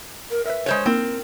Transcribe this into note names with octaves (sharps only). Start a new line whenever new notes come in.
A#4
A#4 B4 E5
G#3 C5 C#5
A#3 C4 D#4 E4 A#4